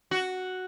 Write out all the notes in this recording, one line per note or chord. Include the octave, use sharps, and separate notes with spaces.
F#4